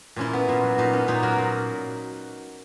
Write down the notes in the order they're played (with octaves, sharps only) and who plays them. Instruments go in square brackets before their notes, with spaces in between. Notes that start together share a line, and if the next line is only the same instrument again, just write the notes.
[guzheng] A#2 C#4 E4
B3
A#2
F#3
A#2 D#4
B3 C#4
A#2 D#4
F#3 F#4 A#4
A#2